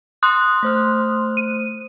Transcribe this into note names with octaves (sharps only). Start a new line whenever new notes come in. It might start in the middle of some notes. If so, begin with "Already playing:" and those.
C6 D#6 F#6
A3 C5 F6
D#7